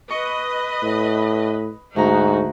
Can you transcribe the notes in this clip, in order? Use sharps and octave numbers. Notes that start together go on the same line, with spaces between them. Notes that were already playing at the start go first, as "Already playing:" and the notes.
B4 D#5 C#6
A2
D2 G#2 D#4 F#4 A#5